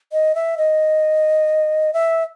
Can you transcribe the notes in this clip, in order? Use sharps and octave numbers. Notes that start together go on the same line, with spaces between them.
D#5
E5
D#5
E5